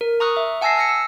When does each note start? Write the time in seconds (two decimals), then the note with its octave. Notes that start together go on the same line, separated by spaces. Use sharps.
0.01 A#4
0.20 A#5 C#6 D#6 F6 F#6
0.37 E5
0.61 F#5 G#5 A5 E6 A#6 C7
0.76 E6 F6 A#6 C#7
0.89 E6